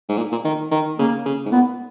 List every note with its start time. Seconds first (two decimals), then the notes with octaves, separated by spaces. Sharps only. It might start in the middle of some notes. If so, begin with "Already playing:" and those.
0.09 G#2
0.18 A#2
0.32 A#2
0.45 D#3
0.71 D#3
0.98 C#3 A#3
1.26 C#3
1.45 G#2
1.52 A#2 B3